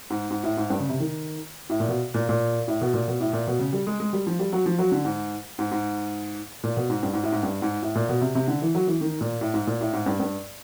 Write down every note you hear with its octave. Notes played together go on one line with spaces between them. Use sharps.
G#2
G#2
A2
G#2
G2
C#3
C3
D#3
A2
A#2
B2
A#2
A#2
A2
B2
A#2
B2
A2
A#2
B2
C#3
G3
G#3
G#3
G3
F3
G3
F#3
F3
F#3
D3
G#2
G#2
G#2
A#2
B2
G#2
G2
G#2
A2
G#2
G2
G#2
A2
A#2
B2
C3
C3
D3
E3
F#3
E3
D#3
A#2
A2
G#2
A#2
A2
G#2
G2
G2